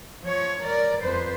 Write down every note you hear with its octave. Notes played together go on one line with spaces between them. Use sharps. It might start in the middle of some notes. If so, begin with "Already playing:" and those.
F3 C#5
A#4 D5
F2 B4 C5